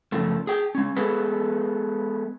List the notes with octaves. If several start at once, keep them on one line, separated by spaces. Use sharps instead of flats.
F#2 C#3 F3 A3
G#4 G5
G#3 C#4
G#3 B3 G#4 A4 B4